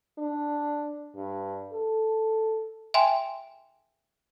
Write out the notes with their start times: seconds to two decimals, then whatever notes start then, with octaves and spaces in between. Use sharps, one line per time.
0.18 D4
1.15 G2
1.72 A4
2.94 E5 G5 G#5 C6